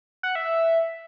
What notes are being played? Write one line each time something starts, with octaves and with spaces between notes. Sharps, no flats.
F#5
E5